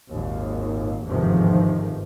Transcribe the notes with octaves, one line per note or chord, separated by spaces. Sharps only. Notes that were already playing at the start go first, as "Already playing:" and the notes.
G#1 D#2 A#2
G1 E2 G#2 C3 D#3 F3